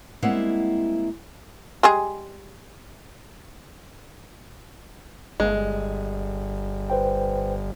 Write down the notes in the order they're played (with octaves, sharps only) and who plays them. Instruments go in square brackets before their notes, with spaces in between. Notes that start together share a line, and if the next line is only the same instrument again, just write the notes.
[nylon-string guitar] G3 G#3 A#3 C4 E4 F#5
[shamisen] G3 G#3 G#4
[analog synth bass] G1 [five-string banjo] G#3
[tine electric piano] B4 C5 G5